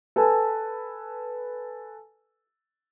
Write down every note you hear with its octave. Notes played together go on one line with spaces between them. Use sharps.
A4 B4 G#5 A5